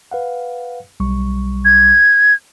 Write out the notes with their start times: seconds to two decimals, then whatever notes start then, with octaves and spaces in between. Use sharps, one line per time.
0.11 B4 F5 F#5
1.00 B1 G3 C#6
1.65 G#6